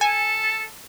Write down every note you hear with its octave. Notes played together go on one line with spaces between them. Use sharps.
A4 G#5